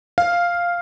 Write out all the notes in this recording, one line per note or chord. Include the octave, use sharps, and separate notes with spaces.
F5